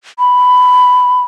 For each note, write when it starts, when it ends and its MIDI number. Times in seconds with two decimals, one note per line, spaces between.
0.19 1.21 83